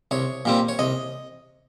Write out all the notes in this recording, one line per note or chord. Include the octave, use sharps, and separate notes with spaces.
C2 C#5
A#2 G3 C4
C#5
C2 D#5